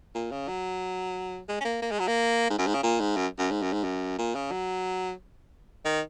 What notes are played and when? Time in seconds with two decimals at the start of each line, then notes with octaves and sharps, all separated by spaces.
0.15 A#2
0.31 C#3
0.48 F#3
1.49 G#3
1.61 C#4
1.65 A#3
1.82 A#3
1.91 G#3
1.99 F#3
2.08 A#3
2.50 G#2
2.59 F#2
2.67 G#2
2.74 C#3
2.83 A#2
3.00 G#2
3.17 F#2
3.39 F#2
3.51 G#2
3.62 F#2
3.73 G#2
3.84 F#2
4.18 A#2
4.35 C#3
4.51 F#3
5.85 D#3